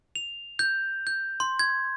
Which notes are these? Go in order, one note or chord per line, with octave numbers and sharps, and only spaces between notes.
F7
G6
G6
C6
G#6